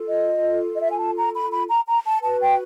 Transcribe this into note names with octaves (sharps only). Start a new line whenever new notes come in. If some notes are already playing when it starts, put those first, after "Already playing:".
Already playing: F4 A4
D#5
D#5
E5
G#5
A5
A#5
B5
B5
A#5
A#5
A5
F#4 B4 A5
G5